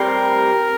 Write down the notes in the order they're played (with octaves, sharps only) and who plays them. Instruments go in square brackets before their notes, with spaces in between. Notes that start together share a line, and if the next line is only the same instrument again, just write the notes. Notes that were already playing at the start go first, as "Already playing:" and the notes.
Already playing: [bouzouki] A2 G3 C4 [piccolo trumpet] A#4